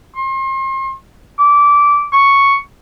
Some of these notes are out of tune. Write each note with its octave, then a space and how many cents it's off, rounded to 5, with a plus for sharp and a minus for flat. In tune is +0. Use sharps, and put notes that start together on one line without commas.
C6 +40
D6 -15
C#6 +0